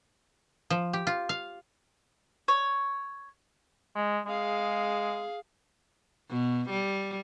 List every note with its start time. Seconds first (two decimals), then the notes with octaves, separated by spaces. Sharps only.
0.70 F3
0.93 G4
1.07 F4
1.29 F5
2.48 C#5
3.96 G#3
4.26 G#3 G#4 F5
6.30 B2
6.70 G3